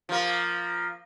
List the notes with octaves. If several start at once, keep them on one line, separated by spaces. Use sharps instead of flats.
F3 A#3